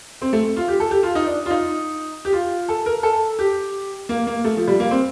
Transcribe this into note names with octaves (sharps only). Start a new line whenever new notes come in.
C4
A3
F4
G4
A4
G4
F4
D#4
D4
F4
D#4
G4
F4
A4
A#4
A4
G4
A#3
A#3
A3
F3
G3
A#3
C4